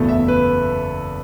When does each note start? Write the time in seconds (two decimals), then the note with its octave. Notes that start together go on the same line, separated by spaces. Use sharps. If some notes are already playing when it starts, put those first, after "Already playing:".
Already playing: F#1 E2 B2 A3
0.09 E5
0.28 B4